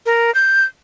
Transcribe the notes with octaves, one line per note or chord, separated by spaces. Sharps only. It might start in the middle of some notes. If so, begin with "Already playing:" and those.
A#4
G6